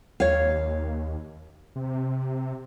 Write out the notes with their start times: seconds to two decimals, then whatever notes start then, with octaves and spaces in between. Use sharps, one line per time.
0.20 D#2 C#5 F5
1.76 C3